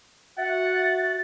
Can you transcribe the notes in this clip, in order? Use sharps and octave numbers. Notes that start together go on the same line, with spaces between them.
F#4 E5 F#5 A6